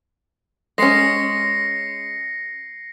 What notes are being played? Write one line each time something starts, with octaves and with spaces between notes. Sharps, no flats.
G#3 C#4 A#6 C7 C#7